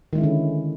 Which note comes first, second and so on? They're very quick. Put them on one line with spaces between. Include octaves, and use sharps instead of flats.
D#3 G#3 E4 C#4 D3